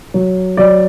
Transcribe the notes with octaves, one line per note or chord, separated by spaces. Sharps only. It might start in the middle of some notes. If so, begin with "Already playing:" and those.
F#3
F#3 D5